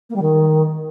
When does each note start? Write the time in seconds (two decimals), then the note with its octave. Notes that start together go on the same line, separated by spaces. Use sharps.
0.10 A#3
0.16 G3
0.22 D#3